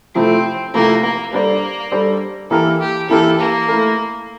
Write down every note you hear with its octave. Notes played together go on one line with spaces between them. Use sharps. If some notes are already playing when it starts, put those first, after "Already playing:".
C3 F3 A3 C4 E4
C3 F3 A3 A#3 E4
A#3
G3 A#3 D4 A4 C5
G3 D4 A4 C5
E3 A#3 E4 G4 A4 A#4
G4
E3 A#3 E4 G4 A4 A#4
A#3
A3 E4 A#4